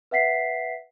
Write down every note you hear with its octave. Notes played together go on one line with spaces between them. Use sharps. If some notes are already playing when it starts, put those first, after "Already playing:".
B4 E5 F#5 B6 C7